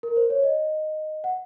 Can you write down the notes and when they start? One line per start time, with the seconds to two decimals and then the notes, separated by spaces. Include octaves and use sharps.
0.03 A#4
0.17 C5
0.30 C#5
0.43 D#5
1.24 F#5